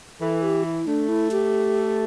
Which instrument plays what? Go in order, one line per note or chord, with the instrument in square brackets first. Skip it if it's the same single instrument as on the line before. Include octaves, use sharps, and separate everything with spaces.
[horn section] E3 [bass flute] A4
[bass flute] G4
E4
[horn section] A3 [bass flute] D4
[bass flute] E4
G4